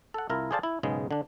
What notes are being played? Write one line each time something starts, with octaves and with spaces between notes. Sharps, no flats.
A4 F#5
C2 E4 F4 A#4 A5
G#4 A4 C5 D5 F5 A5
E4
B1 G#2 C#3 G#3 B3
D3 D4